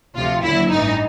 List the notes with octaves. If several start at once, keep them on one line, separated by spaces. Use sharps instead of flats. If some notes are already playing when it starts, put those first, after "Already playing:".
D2 C3 F3 F4
D#2 D3 F#3 E4
A1 G2 E3 D#4